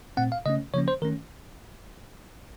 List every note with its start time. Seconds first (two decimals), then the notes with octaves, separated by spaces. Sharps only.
0.17 A#2 A3 C4 F#5
0.32 F5
0.46 C#3 A3 C#4 D#5
0.74 C#3 F3 A#3 C#4 C#5
0.88 C5
1.02 D#3 A3 C#4 A#4